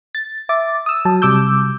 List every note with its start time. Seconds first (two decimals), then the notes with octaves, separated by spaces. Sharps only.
0.15 A6
0.49 E5 D6 A6
0.86 D#6 E6
1.05 F#3 A5
1.22 C3 G3 D6 E6 G6